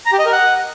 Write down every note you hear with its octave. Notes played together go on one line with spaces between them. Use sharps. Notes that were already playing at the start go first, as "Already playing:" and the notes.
A#5
G4
D#5
A#4
F#5